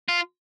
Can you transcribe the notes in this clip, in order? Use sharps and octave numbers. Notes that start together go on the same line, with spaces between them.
F4